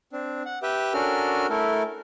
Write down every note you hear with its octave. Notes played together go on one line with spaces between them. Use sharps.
C4 D4
F#5
G4 B4 E5 G5
C#4 D4 F#4 A4 A#4 F6
A3 E4 A4 A#4